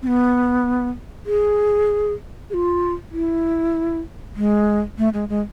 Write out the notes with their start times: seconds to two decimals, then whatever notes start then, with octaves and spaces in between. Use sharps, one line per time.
0.02 C4
0.07 B3
1.26 G#4
2.50 G#4
2.54 F4
3.12 E4
4.36 G#3
4.98 A3
5.14 G#3
5.29 G#3